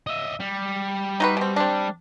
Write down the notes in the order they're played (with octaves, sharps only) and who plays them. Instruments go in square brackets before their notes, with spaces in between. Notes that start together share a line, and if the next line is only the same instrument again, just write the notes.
[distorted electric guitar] D#5 E5
G3
[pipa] D#4 F#4 B4
B2 C4
C4 D4